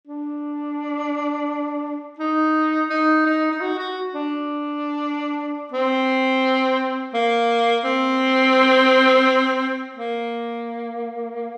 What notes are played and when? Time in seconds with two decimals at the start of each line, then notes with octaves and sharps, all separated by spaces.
0.07 D4
2.19 D#4
2.90 D#4
3.26 D#4
3.52 D#4
3.61 F#4
3.79 F#4
4.14 D4
5.72 C4
7.14 A#3
7.84 C4
9.96 A#3